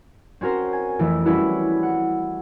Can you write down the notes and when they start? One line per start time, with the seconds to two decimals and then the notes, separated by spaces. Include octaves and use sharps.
0.41 C4 C#4 F#4 A#4 C5
0.73 G#5
0.99 F2 E3 A3 E4
1.26 G3 C#4 E4 F#4 B4
1.83 F#5